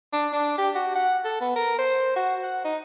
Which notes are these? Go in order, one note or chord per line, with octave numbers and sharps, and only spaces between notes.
D4
D4
G4
F#4
F#5
A4
B3
A#4
C5
F#4
F#5
D#4